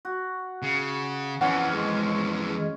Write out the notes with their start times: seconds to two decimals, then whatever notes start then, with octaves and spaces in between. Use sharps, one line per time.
0.05 F#4
0.62 C#3
1.41 F2 E3 C#4 F4 F#5
1.73 G#3